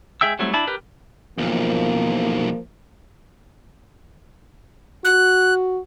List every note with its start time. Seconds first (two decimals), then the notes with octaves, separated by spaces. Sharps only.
0.21 G#3 G#4 E5 G5 E6
0.39 F#3 G3 A3 C4 E4
0.53 D4 E4 A5 B5
0.67 G4 A#4 B4
1.38 B1 E2 F3 A#3
5.05 F#4 F#6